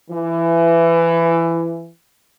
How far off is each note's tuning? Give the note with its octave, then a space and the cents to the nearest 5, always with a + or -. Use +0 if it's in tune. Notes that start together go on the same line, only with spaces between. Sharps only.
E3 +20